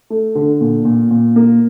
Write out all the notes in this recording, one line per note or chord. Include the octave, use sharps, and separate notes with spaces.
A3
D3
A#2
A#2
A#2
A#3